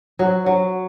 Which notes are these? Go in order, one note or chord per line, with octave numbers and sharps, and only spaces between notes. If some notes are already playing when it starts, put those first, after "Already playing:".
F#3
F#3